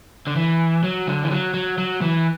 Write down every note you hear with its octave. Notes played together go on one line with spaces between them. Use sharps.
D3
E3
F#3
D3
E3
F#3
F#3
F#3
E3